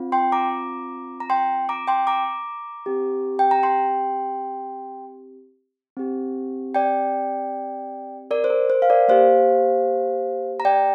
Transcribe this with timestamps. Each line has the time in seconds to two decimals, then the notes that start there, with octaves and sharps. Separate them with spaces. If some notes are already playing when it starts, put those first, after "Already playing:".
Already playing: C4 F4
0.12 G5 C6
0.32 A#5 D6
1.20 A#5
1.30 G5 C6
1.69 A#5 D6
1.87 G5 C6
2.07 A#5 D6
2.86 C4 G4
3.39 G5
3.51 A#5
3.63 G5 C6
5.97 C4 G4
6.75 D5 G5
8.31 A#4 D5
8.44 C5
8.50 A#4
8.70 C5
8.82 F5
8.90 A#4 D5
9.08 A#3 G4 C5 F5
10.60 A#5
10.65 D5 G5